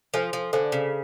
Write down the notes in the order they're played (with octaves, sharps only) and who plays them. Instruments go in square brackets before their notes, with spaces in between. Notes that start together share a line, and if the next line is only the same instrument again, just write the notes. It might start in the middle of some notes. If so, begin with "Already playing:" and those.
[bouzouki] F3 [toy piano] A4 C5 F5 G#5
[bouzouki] F3
[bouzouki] D3 [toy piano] A4 C5 F5 G#5
[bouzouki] C#3